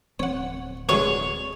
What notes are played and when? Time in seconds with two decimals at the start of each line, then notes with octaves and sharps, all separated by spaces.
0.20 D1 C4 C#5 F#5
0.89 B2 D3 G#3 C#5